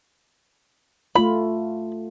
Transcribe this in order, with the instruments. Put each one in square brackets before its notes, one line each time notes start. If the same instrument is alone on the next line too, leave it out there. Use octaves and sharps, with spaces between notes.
[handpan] A3 F4 [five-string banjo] B5